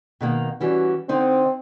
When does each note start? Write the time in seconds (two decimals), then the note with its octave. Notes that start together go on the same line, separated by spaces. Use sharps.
0.21 B2 D#3 A#3
0.61 E3 G3 C#4 F#4
1.09 D3 C4 D#4 C5